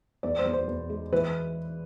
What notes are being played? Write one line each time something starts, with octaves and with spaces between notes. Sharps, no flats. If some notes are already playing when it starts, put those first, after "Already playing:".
E2 D5
C5
E2
C5
E2
G#3
E3 B4